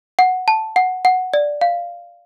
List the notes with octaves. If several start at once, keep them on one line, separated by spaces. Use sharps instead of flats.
F#5
A5
F#5
F#5
D5
F5